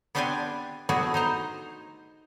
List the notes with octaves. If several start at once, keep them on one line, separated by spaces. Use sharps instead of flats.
B3 C4 D4 G4 D5 G#5
A3 B3 D4 E4 F#4 G#4
D#4 C5 A#5